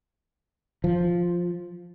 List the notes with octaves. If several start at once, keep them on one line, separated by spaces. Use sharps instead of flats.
F3